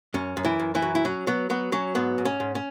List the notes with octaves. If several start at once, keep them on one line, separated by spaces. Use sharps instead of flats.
F#2 C#4
F#2
E3 E4
F#2
E3 E4
F#3
E4
F#3 C#4
F#3 B3
F#3 B3
F#3 C#4
G#2 B3
G#2
C#4
G#2
C#4